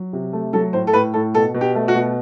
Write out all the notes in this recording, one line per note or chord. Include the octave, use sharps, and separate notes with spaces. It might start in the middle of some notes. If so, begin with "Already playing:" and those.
Already playing: F#3
C3
A3
F#3 A4
A2 C5
A4
A2 B4
A2 A4
B2 A4
B2
G4
A3
F#4
B2